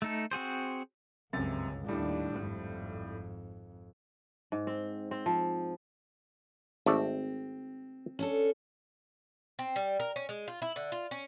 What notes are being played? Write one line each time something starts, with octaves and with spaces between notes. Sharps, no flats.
A3 D#4 A4
C4 F#4 G#4 C5
G1 C#2 F#2 C3 A6
D#2 A2 G3 D4
G#1 F2
G#2
C4
C4
F3
G#1 A3 C4 D5
C#4 D4 A4
C4
G3
A#4
C#4
G#3
F4
E4
D3
F4
C#4